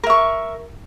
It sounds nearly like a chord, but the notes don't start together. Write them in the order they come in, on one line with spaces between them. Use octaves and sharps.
A#4 E5 C#6